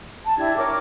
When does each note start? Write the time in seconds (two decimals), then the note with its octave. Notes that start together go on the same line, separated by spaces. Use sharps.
0.24 A5
0.37 D4 E4 G4 G#6
0.57 A#4 C#5 D6